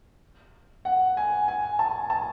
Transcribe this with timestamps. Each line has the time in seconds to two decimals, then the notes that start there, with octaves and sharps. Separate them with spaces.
0.85 F#5
1.17 G#5
1.48 G#5
1.79 A5
2.10 A5